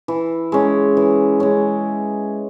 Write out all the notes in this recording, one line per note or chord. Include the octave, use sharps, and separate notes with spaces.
E3
G#3 C#4
E3
G#3 C#4